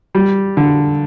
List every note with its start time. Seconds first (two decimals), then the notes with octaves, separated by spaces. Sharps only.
0.15 G3
0.57 D3